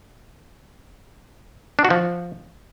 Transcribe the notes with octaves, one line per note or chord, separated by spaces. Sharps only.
D4
F#4
F3